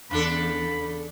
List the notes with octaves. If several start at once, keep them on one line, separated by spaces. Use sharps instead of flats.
E2 C#3 D4 A4 B5